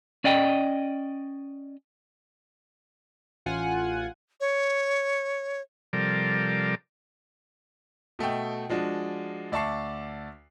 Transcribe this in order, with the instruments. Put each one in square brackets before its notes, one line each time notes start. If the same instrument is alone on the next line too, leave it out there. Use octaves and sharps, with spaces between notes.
[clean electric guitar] C#4 D5 D#5 G5
[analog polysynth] A1 F4 F#5 G#5
[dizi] C#5
[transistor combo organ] C3 F3 G3 A4 A#4 D5
[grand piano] B2 A3 D#5 G5
F3 G#3 D4 F#4
D2 D5 E5 A5 C#6 C7